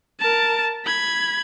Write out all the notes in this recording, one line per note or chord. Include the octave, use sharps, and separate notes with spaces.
A#4 A5
B5 G#6